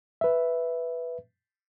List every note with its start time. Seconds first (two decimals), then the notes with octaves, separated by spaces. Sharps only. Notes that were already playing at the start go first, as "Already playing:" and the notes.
0.21 B4 E5